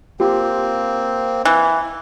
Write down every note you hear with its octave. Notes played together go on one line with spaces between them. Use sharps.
A#3 C4 F4 G4
E3